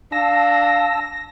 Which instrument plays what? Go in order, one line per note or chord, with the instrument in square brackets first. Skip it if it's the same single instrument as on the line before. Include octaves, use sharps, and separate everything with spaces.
[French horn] D4 [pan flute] F5 [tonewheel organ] A5 E6 [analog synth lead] A#6